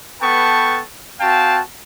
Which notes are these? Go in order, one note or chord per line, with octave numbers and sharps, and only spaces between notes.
B3 A4 B4 G5 A5 C#6
C4 F#4 F5 G5 A5